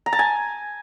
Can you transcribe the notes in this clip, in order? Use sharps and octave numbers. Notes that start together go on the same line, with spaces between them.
A#5
A5
G#5